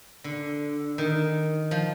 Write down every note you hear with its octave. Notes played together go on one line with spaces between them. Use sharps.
D3
D#3
F3